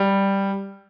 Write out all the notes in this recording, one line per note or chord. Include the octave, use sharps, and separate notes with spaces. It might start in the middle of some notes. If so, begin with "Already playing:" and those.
Already playing: G3